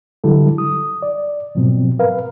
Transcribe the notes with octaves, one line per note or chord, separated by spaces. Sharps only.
D3 F#3 G3 E4 A4
D#6
D5
G#2 B2 F3 F#3 C4
A#4 B4 F5